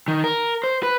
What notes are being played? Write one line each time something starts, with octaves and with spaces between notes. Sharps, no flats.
D#3
A#4
C5
B4